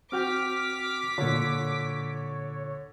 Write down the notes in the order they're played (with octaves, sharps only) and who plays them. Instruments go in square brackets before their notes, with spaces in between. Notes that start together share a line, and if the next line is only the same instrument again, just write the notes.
[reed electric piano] C4 F#4 G5 [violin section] D6 B6 [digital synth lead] F6
[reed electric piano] A#2 F4 [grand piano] D3 [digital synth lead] C#5